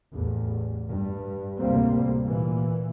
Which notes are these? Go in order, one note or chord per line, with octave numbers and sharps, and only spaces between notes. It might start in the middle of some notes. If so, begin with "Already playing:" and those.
A1 E2
G2
D2 A2 C3 G3 A#3 C4
A#2 E3